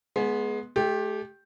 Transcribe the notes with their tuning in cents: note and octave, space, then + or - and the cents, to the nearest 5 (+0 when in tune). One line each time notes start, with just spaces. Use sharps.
G#3 +20 B3 -15
A3 -35 G4 +0